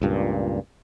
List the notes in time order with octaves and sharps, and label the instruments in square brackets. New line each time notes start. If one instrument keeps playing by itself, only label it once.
[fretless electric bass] C#2 G2 A#2